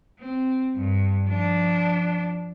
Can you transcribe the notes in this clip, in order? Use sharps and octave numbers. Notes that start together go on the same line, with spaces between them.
C4
G2
F3 D4